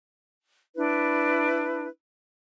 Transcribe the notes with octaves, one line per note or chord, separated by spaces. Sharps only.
D4 E4 B4